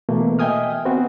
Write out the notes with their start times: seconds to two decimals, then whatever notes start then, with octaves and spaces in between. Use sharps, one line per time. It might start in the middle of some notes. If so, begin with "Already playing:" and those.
0.09 B2 E3 A3 A#3
0.39 D#5 E5 G5 G#5 D#6 F6
0.85 B3 C4 F#4